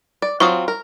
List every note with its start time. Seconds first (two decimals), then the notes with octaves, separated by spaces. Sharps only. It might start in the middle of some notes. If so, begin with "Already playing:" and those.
0.22 D5
0.40 F#3 C4 F4 C#6 D#6
0.68 A#4